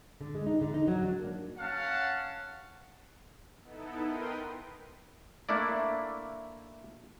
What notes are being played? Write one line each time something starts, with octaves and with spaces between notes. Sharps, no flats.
D3
G#3
D#4
D3
D#4
F#3
D4
A#3
C#4 F5 F#5 A5
B3 D#4 E4 A4
A#4 B4 G5 C6 D#6
A3 A#3 D4 E4 D5